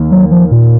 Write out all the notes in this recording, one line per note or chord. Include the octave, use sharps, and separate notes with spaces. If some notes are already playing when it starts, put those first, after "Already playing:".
Already playing: D#2 D#3 A#3
F#3
F3
A#2